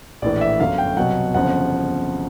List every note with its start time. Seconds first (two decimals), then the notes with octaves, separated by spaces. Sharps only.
0.22 A#1 A2 E3 D5
0.41 E5
0.59 G1 F#2 D3 F#3 F5
0.78 G5
0.97 C2 B2 F#3 F#5
1.34 G1 F2 C#3 F3 F#5